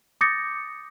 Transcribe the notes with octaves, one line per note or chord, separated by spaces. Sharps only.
D6 D#6 G6 A6 A#6 C#7